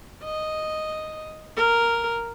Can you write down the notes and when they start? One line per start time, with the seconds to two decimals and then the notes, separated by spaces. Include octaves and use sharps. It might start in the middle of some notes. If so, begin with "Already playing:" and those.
0.24 D#5
1.56 A#4